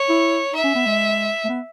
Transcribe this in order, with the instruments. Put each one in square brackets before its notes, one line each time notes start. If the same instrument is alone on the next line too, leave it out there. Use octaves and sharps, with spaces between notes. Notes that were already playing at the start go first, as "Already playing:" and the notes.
Already playing: [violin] C#5
[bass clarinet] E4
[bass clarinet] D#4 [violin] E5
[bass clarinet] C#4
B3
G#3
A3
B3